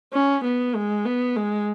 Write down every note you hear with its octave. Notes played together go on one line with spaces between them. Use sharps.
C#4
B3
G#3
B3
G#3